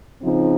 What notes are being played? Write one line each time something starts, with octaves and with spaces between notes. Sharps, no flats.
C#3 F3 C4 D#4